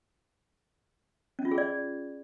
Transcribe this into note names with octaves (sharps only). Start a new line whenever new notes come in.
C#4
F4
G#4
D5